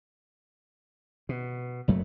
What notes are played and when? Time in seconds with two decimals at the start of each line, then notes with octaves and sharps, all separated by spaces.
1.29 B2
1.88 F#1 F#2 F#3 A3